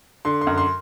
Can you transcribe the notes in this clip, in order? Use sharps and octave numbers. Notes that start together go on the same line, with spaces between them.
D3 C6
C6
F#2
C6